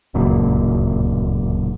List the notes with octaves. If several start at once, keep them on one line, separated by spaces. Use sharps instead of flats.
D1 C#2 F#2 A#2